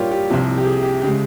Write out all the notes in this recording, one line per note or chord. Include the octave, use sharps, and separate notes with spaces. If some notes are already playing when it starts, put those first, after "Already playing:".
Already playing: A#2 G3 A#3 F4 G4 C#5
G4
C2 C3 F3
G4
G#4
G4
C#3 G#3 G4